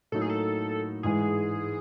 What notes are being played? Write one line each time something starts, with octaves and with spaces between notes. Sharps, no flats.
A2 F#3 A#3 D#4 A4
G#4
A4
G#2 E3 G#3 G#4